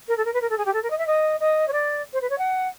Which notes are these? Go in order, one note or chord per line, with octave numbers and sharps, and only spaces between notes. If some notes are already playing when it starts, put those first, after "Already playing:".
A#4
A4
A#4
B4
A#4
A4
G#4
G4
A4
A#4
D#5
E5
D#5
D#5
C#5
D5
C5
B4
C#5
F#5